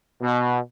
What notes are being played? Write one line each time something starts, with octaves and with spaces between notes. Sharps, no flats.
B2